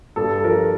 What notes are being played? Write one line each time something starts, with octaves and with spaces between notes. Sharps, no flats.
G2 A4
F3 A#4